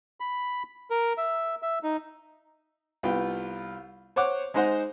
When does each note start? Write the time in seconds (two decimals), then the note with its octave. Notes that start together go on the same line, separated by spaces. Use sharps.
0.20 B5
0.90 A#4
1.18 E5
1.62 E5
1.83 D#4
3.03 C2 B3 F4 G5
4.16 C5 C#5 F#5 D6
4.54 G#3 D#4 G#4 C5 F#5